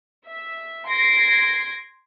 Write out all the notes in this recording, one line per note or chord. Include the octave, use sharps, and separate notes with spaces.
E5
C6 G#6 A#6 C7 D7